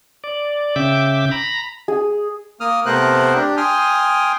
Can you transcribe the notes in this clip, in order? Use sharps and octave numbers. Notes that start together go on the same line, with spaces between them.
D5
C#3 E5 G5 D6
A#5 B5
G#4
A#3 D#6 F6
C3 A3 B3 A#4 C5 F#6
D4 G4
G5 G#5 C6 D#6 F6